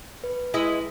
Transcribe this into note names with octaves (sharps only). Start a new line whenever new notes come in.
B4
G#3 E4 D#5